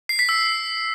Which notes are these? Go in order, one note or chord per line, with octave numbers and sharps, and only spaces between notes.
C7
B6
E6